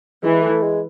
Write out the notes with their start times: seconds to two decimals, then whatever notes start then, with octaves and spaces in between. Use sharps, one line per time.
0.23 E3 G#3
0.42 A3
0.63 G#3